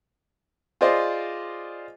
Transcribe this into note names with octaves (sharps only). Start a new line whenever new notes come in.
F4 G#4 C5 D5 D#5